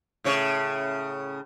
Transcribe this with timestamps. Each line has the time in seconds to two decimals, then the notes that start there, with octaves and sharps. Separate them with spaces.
0.24 A2 C#3 C#5